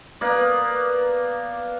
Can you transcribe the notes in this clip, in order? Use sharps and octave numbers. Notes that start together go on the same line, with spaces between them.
A#3 B3 B4 D5